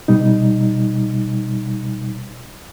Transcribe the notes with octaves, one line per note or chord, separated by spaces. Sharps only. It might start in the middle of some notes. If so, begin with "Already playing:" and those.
B2 G3 D#4